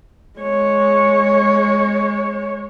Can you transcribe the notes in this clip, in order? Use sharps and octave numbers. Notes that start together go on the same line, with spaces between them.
G#3 C#5